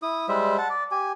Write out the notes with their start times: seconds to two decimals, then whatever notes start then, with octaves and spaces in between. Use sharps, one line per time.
0.02 E4 D#6
0.29 G3 G#3 C5 E5
0.58 F#5 A5
0.70 D5
0.91 G4 G#5